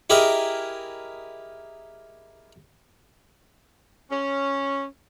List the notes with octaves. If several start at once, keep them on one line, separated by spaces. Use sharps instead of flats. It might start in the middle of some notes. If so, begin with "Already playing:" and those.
E4 G4 G#4 A#4 D#5
C#4